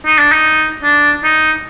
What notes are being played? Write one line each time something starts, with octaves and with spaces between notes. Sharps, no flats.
D#4
D4
D#4
D4
D#4